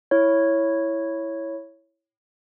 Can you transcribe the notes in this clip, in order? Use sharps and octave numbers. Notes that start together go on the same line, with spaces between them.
E4 C#5